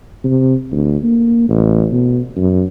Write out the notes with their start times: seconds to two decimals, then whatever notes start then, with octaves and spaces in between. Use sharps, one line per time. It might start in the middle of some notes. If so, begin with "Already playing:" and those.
0.24 C3
0.72 D2
1.03 A#3
1.49 A1
1.92 B2
2.37 F#2